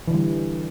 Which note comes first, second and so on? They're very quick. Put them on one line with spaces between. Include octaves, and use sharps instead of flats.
E3 D3 G3